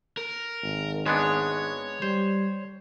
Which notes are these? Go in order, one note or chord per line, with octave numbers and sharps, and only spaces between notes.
A#4
G#1
G#3 B3 D4 C#5
G3 C5